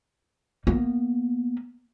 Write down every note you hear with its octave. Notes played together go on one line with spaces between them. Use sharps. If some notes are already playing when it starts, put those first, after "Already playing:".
A#3 B3